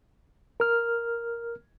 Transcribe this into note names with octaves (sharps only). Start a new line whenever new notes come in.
A#4 F6